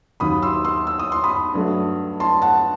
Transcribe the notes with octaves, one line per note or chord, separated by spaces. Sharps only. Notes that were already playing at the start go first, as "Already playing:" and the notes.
D#2 D#3 F#3 B5 D#6
C6 E6
C6 E6
E6
D#6
C6
B5 D#6
G2 F#3 A3
A5 C6
F#5 A5